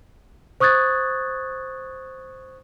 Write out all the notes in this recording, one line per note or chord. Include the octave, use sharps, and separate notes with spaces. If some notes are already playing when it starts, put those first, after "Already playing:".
C5 C#6 D#6 F#6 G#6 A6